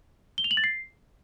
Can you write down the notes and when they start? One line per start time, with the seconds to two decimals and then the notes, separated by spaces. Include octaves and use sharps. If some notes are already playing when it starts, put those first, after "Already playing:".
0.38 G7
0.44 F7
0.51 F#7
0.57 A6
0.64 C7